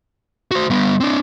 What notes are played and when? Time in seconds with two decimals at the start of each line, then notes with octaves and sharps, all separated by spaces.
0.51 F#4 C5
0.70 G3 B3
1.00 C4 D4